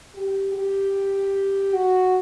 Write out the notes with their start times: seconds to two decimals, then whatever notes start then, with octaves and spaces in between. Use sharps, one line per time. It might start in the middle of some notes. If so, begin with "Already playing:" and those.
0.15 G4
0.54 G4
1.73 F#4